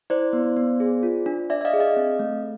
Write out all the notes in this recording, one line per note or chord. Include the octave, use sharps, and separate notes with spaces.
E4 C5 D5
B3
B3
G#4
F4
D4
D4 D5 E5
E5
D#5 F5
G#4
D#5 F5
C4
A3